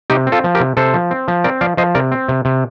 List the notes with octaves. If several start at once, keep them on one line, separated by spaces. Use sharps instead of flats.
C3 D#4 G4
C4
F4 A4
F3
G4 A#4
C3
C3 A4 C5
F3
C4
F3
C4 A#4 D5
F3 D5 F5
F3 C5 D#5
C3 A#4 D5
C4
C3
C3